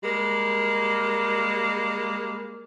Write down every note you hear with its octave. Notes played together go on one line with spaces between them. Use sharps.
G3 G#3 A#3